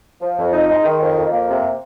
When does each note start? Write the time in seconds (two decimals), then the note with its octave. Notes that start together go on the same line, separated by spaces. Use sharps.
0.21 F3
0.37 F2
0.53 D#4
0.69 G#3
0.85 D#3
1.00 F2
1.16 F2
1.32 A#3
1.48 C3